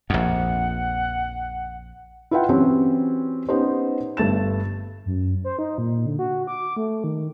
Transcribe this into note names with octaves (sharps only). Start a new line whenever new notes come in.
A#1 F2 F#5
E4 F4 B4 E5 F#5 G5
E3 F#3 C4 C#4 G4
B3 C#4 D#4 G4 C5
G1 G2 A3 A6 E7
F#2
C5
D#4
A#2
D3
F#4
D6
A3
D#3